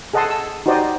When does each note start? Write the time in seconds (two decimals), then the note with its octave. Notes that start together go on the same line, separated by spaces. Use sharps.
0.13 G#4 A4 D#5 F#5 A5 C6
0.30 E6
0.66 D#4 F#4 G4 C5 D5 D#5